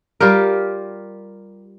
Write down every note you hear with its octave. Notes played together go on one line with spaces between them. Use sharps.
G3 F4 G4 A#4